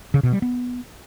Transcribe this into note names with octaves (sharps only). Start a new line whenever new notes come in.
C#3
B2
G3
B3